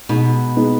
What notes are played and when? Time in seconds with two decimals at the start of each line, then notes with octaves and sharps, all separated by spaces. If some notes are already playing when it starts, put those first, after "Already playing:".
0.09 B2 G#3 B3 D#4
0.57 G#3 B3 D#4